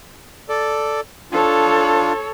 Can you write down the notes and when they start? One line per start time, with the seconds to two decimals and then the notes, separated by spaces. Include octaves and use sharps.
0.49 A4 D5
1.32 D4 F4 A4 C#5